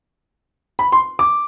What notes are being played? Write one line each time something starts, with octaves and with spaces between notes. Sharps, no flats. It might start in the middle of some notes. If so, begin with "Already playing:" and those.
B5
C6
D6